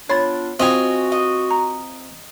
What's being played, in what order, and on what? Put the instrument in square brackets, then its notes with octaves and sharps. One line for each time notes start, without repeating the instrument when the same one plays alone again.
[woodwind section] B3 D4 F4 [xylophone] C#5 B5 A6 [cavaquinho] C6
[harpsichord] C4 F4 [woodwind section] F#4 [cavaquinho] D#5 G#5
[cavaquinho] D#5
[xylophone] A#5